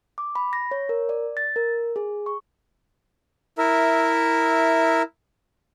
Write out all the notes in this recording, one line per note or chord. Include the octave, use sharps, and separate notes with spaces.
D6
B5
A#6
C#5
A#4
D5
A6
A#4
G#4
C#6
E4 A#4 E5